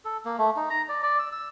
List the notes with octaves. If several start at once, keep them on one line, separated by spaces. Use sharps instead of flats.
A4
A#3
A3
D#4
A#5
D5
D5
E6
E6